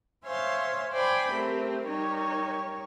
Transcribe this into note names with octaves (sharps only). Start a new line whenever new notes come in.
C5 C#5 E5 F5 G#5 C6
C5 D5 G5 G#5 B5
A3 C4 G4 A#4
G3 D#4 A#4 C#5